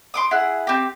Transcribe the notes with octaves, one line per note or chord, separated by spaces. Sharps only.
C6 D6 D#6
E4 G#4 F#5
C4 G4